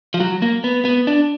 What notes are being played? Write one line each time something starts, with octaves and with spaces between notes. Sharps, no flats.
F3
F#3
A#3
B3
B3
D4